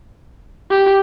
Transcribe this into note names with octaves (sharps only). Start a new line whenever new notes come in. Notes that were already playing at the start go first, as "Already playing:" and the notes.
G4